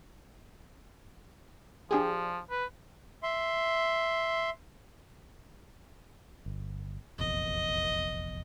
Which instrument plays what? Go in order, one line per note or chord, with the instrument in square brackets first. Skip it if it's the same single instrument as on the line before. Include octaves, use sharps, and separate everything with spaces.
[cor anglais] F3 [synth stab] D4 G4 G#4
[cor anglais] B4
[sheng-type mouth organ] E5 C6
[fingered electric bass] G1
[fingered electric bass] F1 A#1 E2 [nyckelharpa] D#5